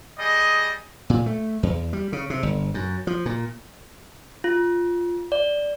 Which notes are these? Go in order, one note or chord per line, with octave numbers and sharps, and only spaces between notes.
G3 G#4 D#5
A#2
A3
E2
G3
C#3
C3
G1
F#2
F3
A#2
F4
D5